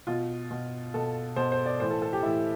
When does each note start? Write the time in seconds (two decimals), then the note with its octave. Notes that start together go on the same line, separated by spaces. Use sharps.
0.07 B2 F4
0.51 B2
0.94 B2 A4
1.36 B2 C5
1.52 C5
1.66 D5
1.80 A2 E3 C5
1.90 A4
2.02 A4
2.13 G4
2.23 A2 E3 E4